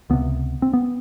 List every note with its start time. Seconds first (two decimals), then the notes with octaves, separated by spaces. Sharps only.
0.10 C#2 C3 B3
0.62 C4
0.73 B3